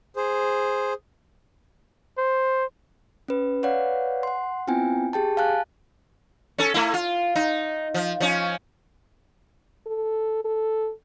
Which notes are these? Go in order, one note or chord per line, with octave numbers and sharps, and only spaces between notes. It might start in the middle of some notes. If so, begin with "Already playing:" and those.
G#4 C5
C5
C#4 B4
B4 C#5 D5 F5 F#5
F#5 C6
B3 C4 E4 F4 G5 G#5
G4 G#4 G5 A5
F5 G#5 A5 F#6
C#4 A4
A3 E4
F4
D#4
F3
F3 C#4
A4
A4